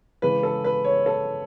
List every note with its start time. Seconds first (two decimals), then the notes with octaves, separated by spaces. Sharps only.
0.22 C#3 E3 G#3 B4
0.43 A4
0.64 B4
0.85 C#5
1.06 A4